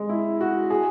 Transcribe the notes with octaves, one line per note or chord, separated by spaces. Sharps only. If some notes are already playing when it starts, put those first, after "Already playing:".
Already playing: G#3
E4
F#4
G#4